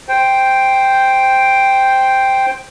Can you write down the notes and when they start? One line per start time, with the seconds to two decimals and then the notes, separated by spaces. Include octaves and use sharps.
0.09 C5 G5